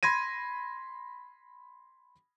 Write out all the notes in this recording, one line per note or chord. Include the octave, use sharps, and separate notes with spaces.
B5 C6 G#6 A#6 D#7